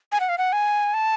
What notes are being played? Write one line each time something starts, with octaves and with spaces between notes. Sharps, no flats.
G#5
F#5
F5
F#5
G#5
A5